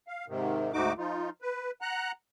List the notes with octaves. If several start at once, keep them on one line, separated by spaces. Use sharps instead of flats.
F5
G#2 C3 D#3
D2 G#2 A3 D#4 F#4 D6
F3 D#4 F4
B4
F#5 A#5 F#6